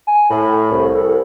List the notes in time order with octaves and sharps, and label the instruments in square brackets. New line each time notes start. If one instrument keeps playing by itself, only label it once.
[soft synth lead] G#5
[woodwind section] A2 [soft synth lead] B5
[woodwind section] C2
[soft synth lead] A4